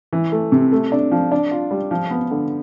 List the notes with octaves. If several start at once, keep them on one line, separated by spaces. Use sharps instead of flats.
E3
A3
C3
A3
D4
F3
D4
F4
G3
F3
B3
D3